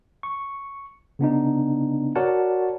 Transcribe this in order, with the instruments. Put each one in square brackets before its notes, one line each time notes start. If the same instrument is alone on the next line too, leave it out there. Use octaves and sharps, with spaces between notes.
[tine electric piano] C#6
C#3 B3 D4 D#4
F#4 A#4 C#5 D5 F#5 A5